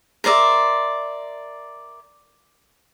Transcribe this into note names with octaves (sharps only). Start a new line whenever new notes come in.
A#4 C5 D5 E5